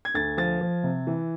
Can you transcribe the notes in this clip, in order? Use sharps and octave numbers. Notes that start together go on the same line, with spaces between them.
G#6
D2 A6
F3 A6
F3
C3
E3